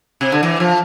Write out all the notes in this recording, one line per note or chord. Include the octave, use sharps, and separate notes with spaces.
C3
D3
E3
F3